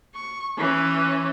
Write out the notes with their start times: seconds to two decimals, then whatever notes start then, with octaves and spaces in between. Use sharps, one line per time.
0.14 C#6
0.57 E3 C#4